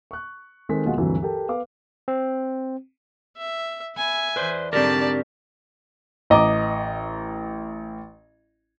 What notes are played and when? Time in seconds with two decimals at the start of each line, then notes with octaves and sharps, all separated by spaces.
0.11 C#6 F#6
0.69 D#3 G#3 C4 A4 B6
0.85 D#2 B2 G#3 F4 F#4 F#5
0.98 D2 G2 C3 E3 F#3
1.22 G4 A4 A#4 G5 A5
1.49 B3 B4 F5 D6
2.08 C4
3.37 E5
3.96 B3 E5 G#5
4.36 E2 B4 C5 D5
4.73 G#2 D3 G3 C4 G4 A#4 D5 A5
6.30 A1 D#5 A#5 D6